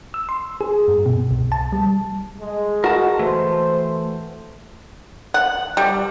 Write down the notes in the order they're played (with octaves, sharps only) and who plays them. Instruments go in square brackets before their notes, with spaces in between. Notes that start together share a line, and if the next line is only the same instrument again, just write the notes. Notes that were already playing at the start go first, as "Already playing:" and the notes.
[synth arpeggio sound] E6
C6
G#4
G2
B2
C2
A5
G3
[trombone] G#3
[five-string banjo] F#4 [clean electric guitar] A#4 A5
[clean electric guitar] E3 A3 [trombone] C5
[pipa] F#5
G3